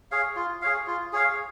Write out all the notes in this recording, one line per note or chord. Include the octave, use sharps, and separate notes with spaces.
G#4 C#5 F5
F4
G#4 C#5 F5
F4
G#4 C#5 F5